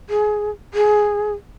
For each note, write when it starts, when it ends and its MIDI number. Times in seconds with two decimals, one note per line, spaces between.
0.10 0.50 68
0.74 1.33 68